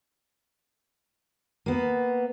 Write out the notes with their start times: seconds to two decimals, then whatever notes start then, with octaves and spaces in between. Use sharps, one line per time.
1.66 A#3 B3